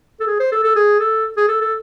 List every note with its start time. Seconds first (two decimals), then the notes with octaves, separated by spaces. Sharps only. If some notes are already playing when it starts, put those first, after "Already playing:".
0.20 A4
0.27 G#4
0.40 C5
0.52 A4
0.64 A4
0.76 G#4
1.00 A4
1.37 G#4
1.48 A4
1.61 A4